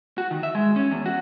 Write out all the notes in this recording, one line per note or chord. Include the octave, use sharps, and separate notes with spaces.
F#4
D#3
E5
G#3
C#4
E2
F#4